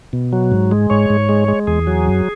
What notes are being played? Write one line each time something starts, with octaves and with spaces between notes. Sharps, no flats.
B2
F#3
G#2
G#3
G#2 C#5
G#2
G#3
G#3
E2 G#4
F#3
F#2